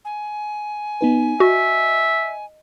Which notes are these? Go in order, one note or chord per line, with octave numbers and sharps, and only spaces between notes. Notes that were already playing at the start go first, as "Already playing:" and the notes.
G#5
B3 D#4 B4
F#4 D#5 E5